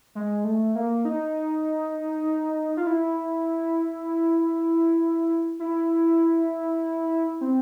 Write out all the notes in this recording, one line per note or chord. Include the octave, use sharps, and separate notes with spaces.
G#3
A3
A#3
D#4
F4
E4
E4
C4